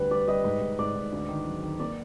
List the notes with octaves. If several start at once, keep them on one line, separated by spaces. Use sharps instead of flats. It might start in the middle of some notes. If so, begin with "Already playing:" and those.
Already playing: D2 G3 B4
G3 D5
G3 D#5
G#2
G#2
G#2 D5
G#2
D2
D#3
F#3
D#3
A#3 D5